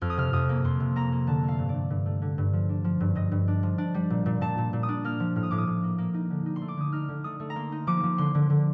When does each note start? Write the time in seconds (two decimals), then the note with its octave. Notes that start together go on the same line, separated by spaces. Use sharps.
0.02 F2 F6
0.10 D#6
0.17 C3 F6
0.33 F2 D#6
0.49 A#3
0.64 F2 C6
0.80 C3
0.96 A#3 A#5
1.12 A#3
1.27 D3 A5
1.43 A3
1.48 F5
1.59 G2
1.69 D5
1.74 G2
1.90 G2
2.06 A3
2.22 D3
2.38 G2
2.53 F3
2.69 D4
2.84 F3
3.00 G2
3.15 G2 D#5
3.31 G2
3.48 D4
3.63 F3
3.78 D4
3.94 G3
4.10 A#2
4.26 A#2
4.41 A#2 A5
4.58 A#2
4.73 A#2
4.83 D#6
4.89 D4
5.04 A#3 F6
5.20 F3
5.36 A2 F6
5.43 D#6
5.51 A2 D6
5.58 D#6
5.67 A2
5.83 A#3
5.98 A#3
6.14 D#4
6.30 D3
6.46 D#4
6.56 C6
6.61 A3
6.68 D6
6.77 D3 D#6
6.92 D#4 F6
7.09 D3
7.24 A3 D#6
7.40 A3
7.50 A#5
7.56 A#3 C6
7.72 D#4
7.87 F3 D6
8.03 F3
8.18 D3 C6
8.35 D3
8.50 D3